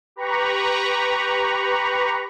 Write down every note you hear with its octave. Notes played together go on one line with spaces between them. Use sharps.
G4 B4 A#5 B5 C#6